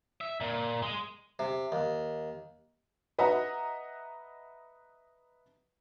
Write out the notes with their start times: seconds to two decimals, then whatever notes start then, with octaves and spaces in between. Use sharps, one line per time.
0.21 E5
0.40 A#2
0.83 G#3
1.39 C3
1.72 D#2
3.19 B4 D#5 E5 F#5 A#5